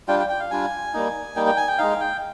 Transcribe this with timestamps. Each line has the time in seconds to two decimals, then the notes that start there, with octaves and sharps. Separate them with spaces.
0.08 G3 D4 F4 G5
0.19 G5
0.29 G5
0.40 F5
0.51 G3 D4 F4 G#5
0.94 G3 A#3 D#4
1.36 G3 A#3 D#4 G5
1.46 G5
1.57 G#5
1.68 G5
1.78 G#3 D#4 F5
2.00 G5